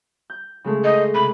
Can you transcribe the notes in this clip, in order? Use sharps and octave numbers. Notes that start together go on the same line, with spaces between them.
G6
C#3 G#3 A3
D#5 C7
C3 B5